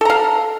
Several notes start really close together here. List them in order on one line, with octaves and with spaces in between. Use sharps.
A4 A#5 F5